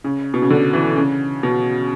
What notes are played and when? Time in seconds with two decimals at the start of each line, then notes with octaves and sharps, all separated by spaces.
0.04 C#3
0.34 B2
0.42 C#3
0.50 D3
0.73 E3
0.96 C#3
1.43 B2